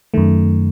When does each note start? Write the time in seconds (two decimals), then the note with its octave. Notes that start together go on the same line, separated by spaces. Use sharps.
0.14 F#2 D#3 A3